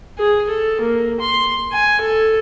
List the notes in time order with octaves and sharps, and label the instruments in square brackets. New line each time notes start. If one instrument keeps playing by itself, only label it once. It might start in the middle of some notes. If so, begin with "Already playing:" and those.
[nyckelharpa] G#4
A4
A#3
C6
G#5
A4